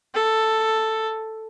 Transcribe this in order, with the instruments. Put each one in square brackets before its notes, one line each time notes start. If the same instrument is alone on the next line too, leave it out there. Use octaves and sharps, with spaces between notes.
[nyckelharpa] A4